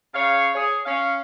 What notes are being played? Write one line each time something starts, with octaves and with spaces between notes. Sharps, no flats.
C#3 C#5 F5
G#4 C#5
C#4 F5